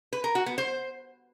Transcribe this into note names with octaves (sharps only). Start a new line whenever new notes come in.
B4
A#4
F#4
B3
C5